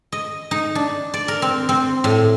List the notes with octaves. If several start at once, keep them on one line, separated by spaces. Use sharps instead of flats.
D#5
D#4
D4
D5
A#4
C4
C4
A2